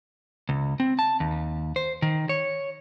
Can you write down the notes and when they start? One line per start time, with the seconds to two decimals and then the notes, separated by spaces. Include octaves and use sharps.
0.49 C#2
0.80 C4
0.99 A5
1.20 D#2
1.76 C5
2.02 D#3
2.29 C#5